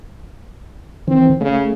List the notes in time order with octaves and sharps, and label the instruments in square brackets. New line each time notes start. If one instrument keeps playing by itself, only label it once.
[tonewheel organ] D#3 E3 [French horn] C4
[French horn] C#3 [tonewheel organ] A3